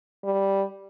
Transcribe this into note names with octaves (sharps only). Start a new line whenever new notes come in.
G3